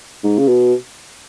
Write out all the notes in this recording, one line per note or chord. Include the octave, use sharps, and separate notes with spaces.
G#2
C#3
B2